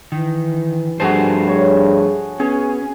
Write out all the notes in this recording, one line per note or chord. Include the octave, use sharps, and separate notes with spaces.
D#3 E3
G2 F3 A3 F#4 G#4 C5 A5
G#4 C#5
B3 C#4 G#4